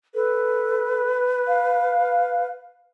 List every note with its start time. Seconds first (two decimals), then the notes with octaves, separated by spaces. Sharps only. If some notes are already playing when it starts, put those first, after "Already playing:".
0.15 A4 B4
1.48 F5